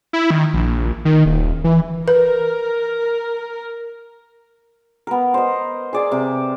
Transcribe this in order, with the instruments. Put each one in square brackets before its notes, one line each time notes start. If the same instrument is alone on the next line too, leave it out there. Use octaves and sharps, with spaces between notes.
[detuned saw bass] E4
D#3
A#1
D#3
D#1
E3
[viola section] A#4 [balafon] B4
[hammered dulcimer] B3 A#4
C5 D#5
G#4 D5 G#5
C3 G4